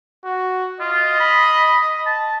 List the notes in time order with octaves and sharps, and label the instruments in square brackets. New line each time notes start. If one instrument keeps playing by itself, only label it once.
[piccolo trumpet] F#4
[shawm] F4 [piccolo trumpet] D#5
[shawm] B5
A5